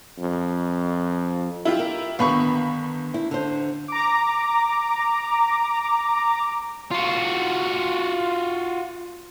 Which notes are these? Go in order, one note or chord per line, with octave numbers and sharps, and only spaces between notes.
F2
E4 F4 G4
A#4
G1 D#3 B3 F5 B5 C#6
E4
D3 C5
A#5 D6
F4 F#4